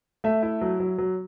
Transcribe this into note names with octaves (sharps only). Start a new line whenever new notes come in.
A3 E5
E4
F#3
F#3
F#3